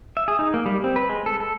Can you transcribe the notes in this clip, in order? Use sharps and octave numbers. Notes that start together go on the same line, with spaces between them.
E5
G#4
D#4
A#3
G3
C4
B4
G#3
A4
A4